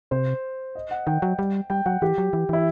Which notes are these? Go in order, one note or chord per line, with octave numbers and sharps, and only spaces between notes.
C3 C5
D#5
F#5
D#3 G5
F#3
G3
G3 G5
F#3 F#5
E3 G4
F#3
E3
E3 E4